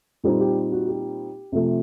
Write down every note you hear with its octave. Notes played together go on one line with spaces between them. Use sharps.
A#2 G3 C4 D#4 A4
G4
F#4
G4
C3 F3 A3